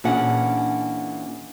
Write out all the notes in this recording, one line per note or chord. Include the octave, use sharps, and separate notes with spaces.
A#2 E3 C#4 D4 G#4 F#5